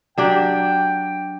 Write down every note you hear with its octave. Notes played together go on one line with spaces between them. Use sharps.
F#3 D4 G4 G5